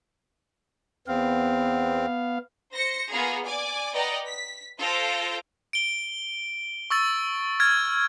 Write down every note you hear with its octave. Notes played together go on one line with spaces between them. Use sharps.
E2 B3 C4 F5
C5 A#6 C#7
A#3 B3 F4 G#4 A#5
D5 G#5 D6
B4 D5 D#5 F#5 G5 A#5
B6
F4 A4 C5 G6 A#6 D7
D7 G7
C#6 E6 A6
F6 G#6 A6